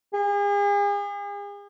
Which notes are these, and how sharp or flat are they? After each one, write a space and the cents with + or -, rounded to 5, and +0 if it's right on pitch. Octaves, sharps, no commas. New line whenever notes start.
G#4 -40